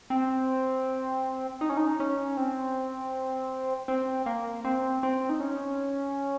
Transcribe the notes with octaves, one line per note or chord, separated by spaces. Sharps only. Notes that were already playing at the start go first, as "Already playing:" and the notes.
C4
D#4
C#4
D#4
C#4
C4
C4
A#3
C4
C4
D#4
C#4